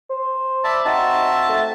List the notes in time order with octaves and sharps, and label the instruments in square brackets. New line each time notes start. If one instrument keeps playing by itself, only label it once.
[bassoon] C5
[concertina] D5 E5 B5 [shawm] A5
[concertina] C4 F#4 E5 [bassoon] D#4 [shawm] A5
[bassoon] A3